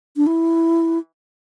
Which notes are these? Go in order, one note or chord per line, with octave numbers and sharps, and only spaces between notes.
D4
E4